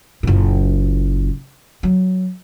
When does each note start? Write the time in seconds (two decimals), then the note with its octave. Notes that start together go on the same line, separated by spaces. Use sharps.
0.23 F#1 A#2
1.83 F#3